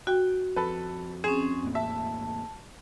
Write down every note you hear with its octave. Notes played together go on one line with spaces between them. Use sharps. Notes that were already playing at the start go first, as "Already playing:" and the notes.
F#4 G5
F2 A4 B4
C4 C#4 G#4
E2 A2 A#3
E5 A5